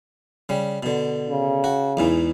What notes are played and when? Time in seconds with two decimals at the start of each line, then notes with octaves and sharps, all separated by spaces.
0.49 C#3 G3
0.83 B2 D3
1.30 C#3
1.64 F#4
1.97 E2 G#2 E3